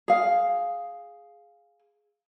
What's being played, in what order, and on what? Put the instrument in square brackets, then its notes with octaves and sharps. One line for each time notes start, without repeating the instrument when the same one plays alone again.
[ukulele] G#4 F5